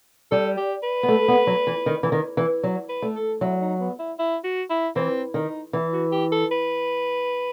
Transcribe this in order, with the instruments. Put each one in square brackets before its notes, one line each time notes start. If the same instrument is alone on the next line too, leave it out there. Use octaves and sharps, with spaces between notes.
[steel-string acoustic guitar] G3 [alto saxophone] A4
[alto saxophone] G4
B4
[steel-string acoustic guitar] B3
A3
B3
F#3
E3
D#3
E3
D#3
E3
F#3
[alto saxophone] B4
[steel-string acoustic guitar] A3
[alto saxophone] A4
[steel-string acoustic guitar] F#3 [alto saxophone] E4
[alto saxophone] D#4
B3
E4
E4
F#4
E4
[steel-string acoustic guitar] E3 [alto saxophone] C4
[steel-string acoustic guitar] D#3 [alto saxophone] D#4
[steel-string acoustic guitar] E3 [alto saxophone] E4
[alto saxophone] F#4
G4
A4
B4